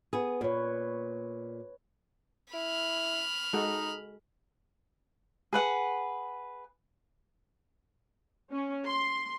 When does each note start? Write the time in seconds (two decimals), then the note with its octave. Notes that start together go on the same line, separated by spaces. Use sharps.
0.13 B3 G#4
0.41 A#2 B4 C#5
2.54 E4 B5 F6
3.53 G#3 D#4 F#4 A4
5.53 G#4 B4 F#5
8.51 C#4
8.86 C6